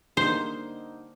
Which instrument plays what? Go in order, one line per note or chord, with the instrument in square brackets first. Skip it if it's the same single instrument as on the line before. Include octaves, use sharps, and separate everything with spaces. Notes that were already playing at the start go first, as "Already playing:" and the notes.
[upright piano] D3 G3 A#3 D#4 [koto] C5